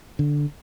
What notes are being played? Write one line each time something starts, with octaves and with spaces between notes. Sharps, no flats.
D3